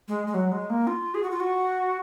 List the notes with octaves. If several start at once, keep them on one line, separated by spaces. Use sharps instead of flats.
G#3
G#3
F#3
G#3
A#3
F4
G#4
F#4
F4
F#4